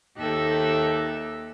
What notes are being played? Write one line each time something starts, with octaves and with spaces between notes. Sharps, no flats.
D#2 D#4 G4 A4 E5 F#6